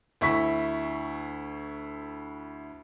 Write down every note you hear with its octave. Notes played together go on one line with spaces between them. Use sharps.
D2 E4 C#6 B6